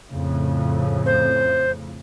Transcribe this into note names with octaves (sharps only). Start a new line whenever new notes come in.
F2 A2 C#3
C5